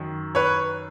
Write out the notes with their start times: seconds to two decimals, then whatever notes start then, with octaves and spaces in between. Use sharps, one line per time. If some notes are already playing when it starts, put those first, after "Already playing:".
Already playing: F#2 D#3
0.35 B4 C#5